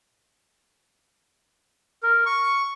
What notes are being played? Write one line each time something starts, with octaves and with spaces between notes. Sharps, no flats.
A#4
C#6